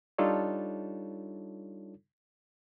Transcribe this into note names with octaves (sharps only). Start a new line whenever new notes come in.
G3 D4 D#4 F4 A4 C#5